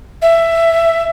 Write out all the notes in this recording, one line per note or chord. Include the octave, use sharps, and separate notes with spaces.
E5